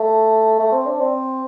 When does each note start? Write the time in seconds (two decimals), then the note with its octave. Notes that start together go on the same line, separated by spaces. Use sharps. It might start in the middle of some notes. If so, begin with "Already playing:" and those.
Already playing: A3
0.59 A3
0.72 C4
0.86 D4
1.00 C4